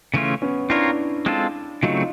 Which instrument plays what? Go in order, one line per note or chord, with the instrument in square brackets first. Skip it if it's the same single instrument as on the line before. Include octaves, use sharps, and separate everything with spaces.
[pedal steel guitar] C#3 E3 A3 C#4 F4
[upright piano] B3 C#4
[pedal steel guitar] C4 F4 A#4 C#5 [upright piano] D4 E4
[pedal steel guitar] G#3 C4 F4 A4
[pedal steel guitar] C#3 F#3 A3 C4 [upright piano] D#4 F4